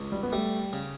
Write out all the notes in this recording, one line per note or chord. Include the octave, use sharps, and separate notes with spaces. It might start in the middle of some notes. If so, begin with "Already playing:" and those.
Already playing: C#2
G3
B3
G3 A3
C#3